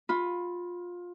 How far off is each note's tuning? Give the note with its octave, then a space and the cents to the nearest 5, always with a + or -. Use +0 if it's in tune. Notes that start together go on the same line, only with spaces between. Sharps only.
F4 +20 B5 +0